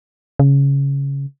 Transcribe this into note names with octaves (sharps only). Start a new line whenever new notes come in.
C#3